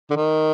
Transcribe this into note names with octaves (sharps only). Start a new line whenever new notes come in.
D3
D#3